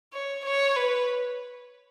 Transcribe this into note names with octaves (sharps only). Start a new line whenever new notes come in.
C#5
C#5
B4